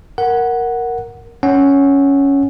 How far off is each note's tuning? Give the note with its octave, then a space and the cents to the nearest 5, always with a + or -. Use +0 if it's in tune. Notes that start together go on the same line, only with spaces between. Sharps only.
A#4 +0 F#5 +0
C#4 +5 F#5 +15